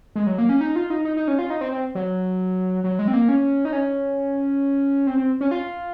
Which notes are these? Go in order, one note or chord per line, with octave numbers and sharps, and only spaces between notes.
G#3
F#3
A#3
C#4
D#4
F4
D#4
D#4
D#4
C#4
F4
D#4
C4
C4
F#3
F#3
G#3
C4
A#3
C#4
D#4
C#4
C4
C4
C#4
F4